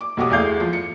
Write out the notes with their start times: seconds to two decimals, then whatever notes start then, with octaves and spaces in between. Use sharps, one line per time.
0.01 D6
0.17 B1 F#4 G4 D6 D#6
0.30 E2 A3 E4 G#4 F5 G6
0.60 F3
0.73 C#7